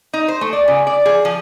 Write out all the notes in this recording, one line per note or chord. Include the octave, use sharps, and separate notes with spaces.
D#4
C5
A3
D5
C#3
D5
G#4
F3